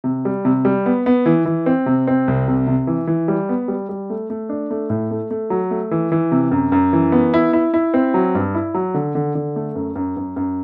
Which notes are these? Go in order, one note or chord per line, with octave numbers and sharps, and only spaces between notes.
C3
G3
C3
G3
B3
B3
E3
E3
C4
C3
C4
C2
C3
C3
E3
E3
G3
B3
G3
G3
A3
A3
D4
A3
A2
A3
A3
F#3
A3
E3
E3
C3
F#2
F#2
E3
B3
E4
E4
E4
C4
F#3
G2
E4
F#3
D3
D3
D3
A3
F#2
F#2
F#2
F#2